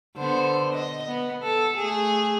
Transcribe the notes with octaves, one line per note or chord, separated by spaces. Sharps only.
D3 B3 C5
D#5
B3
A4
A3 G#4